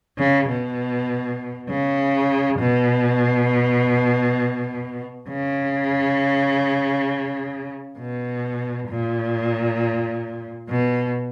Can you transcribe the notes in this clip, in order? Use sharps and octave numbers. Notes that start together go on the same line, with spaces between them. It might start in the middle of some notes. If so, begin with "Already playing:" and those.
C#3
B2
C#3
B2
C#3
B2
A#2
B2